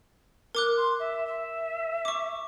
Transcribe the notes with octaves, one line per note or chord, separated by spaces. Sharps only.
A#4 D6 F#6
C6
E5
E5
C#6 D6